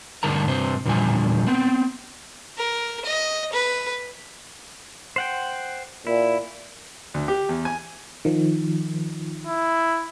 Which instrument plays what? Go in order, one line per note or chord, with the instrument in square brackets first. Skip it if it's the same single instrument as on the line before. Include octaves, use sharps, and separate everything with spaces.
[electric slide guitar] G2 D3 A#4 A5 A#5
G2 C3 C4 C5
E2 A#2 D3 F3 G3 G#5
B3 C4
[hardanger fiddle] A#4
D#5
B4
[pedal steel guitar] C5 F#5 G5
[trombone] A#2 [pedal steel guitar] E4
[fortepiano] D2
G4
E2
G#5
[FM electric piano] D#3 F3
[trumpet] E4